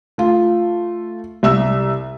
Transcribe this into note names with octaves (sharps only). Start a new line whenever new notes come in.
A3 F4
C2 E5 E6